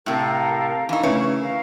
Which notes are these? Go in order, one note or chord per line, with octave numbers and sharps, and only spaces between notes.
A2 C3 A4 A#4 F5
E3 D#4 F5 C#6
C#3 A3 C#4 E4 B4 C#5
A#4 F5